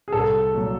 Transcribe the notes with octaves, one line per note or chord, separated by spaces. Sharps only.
G#4
C2 A4
A#2 F#3